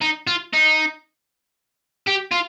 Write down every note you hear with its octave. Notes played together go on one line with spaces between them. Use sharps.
D#4
F4
D#4
G4
F4